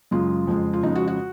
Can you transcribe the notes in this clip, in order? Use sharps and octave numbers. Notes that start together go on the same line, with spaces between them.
F#2 C#3 G#3 F4
F2 C#3 G#3
F4
F2 C#3 G#3 D#4
F#4
F#4